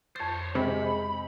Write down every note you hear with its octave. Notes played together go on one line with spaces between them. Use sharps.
F2 C5 C#5 A6
C3 G#3 B5